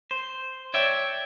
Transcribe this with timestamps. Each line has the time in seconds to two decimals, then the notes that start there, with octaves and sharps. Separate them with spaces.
0.11 C5
0.74 C#5 D5 E5 G5